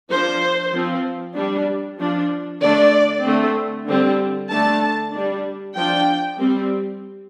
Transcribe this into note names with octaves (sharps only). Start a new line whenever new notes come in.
F3 D4 C5
F3 C4
G3 D4
F3 D4
D3 A3 D4 D5
D3 A3 C4
D3 G3 C4
D3 A3 D4 A5
G3 D4
F3 D4 G5
G3 C4